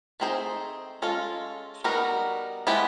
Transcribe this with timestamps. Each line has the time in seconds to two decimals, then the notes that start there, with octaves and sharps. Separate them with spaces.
0.20 A3 C4 D#4 G#4 C5
1.02 G#3 C#4 F4 A4
1.84 G3 B3 D#4 F#4 A#4
2.67 G#3 B3 E4 G4